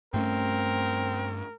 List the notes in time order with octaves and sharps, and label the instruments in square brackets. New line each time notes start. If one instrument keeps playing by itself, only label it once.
[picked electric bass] G2 A3 C#4 [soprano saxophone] C4 [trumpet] A#4